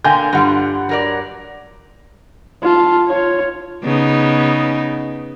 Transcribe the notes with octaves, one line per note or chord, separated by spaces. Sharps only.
D3 A#3 G5 G#5 G6
G2 D3 G3 F4 F#5
F#3 A#4 D5
F4 A5
F4 C#5
C#3 B3 D#4